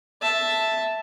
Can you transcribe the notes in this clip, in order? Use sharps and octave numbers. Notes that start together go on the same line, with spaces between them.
E5 A5